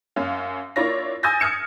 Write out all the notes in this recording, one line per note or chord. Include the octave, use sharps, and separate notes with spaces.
F#2 C#4 F5
A#3 D4 E4 F4 C#5 A#6
G#5 D#6 E6 G6 A6 A#6
D#6 F6 G#6 C#7 E7